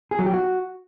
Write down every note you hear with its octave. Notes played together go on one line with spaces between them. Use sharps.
G#4
F#3
G4
F#4